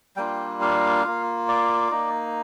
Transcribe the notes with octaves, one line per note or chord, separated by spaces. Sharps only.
G3 A#3 D4 F4 G5
F5
A#3 F4
D5
A#3 D#4